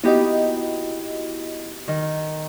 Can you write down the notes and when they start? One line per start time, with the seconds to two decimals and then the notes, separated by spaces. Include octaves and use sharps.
0.04 B3 D#4 E4 F#4 G4 D#5
1.88 D#3